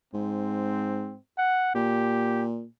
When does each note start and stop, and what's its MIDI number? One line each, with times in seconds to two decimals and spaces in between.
0.14 1.14 44
0.14 1.19 60
1.38 1.74 78
1.75 2.65 46
1.75 2.46 67